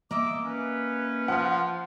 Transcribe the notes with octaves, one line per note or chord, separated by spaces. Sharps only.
A#3 D#5 E5 D6
C#4 B4
F3 F#5 F6